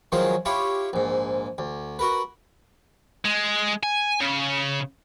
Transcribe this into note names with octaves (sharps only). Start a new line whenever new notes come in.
D#3 F3 F#3 G#3 F4 C5
E4 F4 G4 C#5
A#1 G#2
D2
F#4 A#4 B4
G#3
G#5
C#3